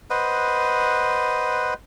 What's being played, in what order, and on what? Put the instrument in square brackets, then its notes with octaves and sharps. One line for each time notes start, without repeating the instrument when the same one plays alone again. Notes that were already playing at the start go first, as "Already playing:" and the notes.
[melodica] B4 C5 D#5 F#5